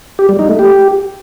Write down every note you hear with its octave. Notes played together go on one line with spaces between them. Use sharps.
G4
G3
D#4
A3
G4